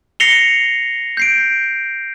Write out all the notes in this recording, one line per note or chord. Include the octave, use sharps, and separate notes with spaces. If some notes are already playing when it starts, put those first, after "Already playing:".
A#6 C7 C#7 F7 G7
G6 C7 D7